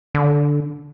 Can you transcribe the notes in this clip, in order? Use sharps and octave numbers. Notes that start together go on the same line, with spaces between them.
D3